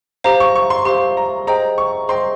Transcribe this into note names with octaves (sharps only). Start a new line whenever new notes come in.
G4 C5 F5 A#5
C#6
C#6
C6
G4 C5 F5 C6
A#5
G#4 C5 D#5 G5 A#5
C#6
G#4 C5 D#5 G5 C6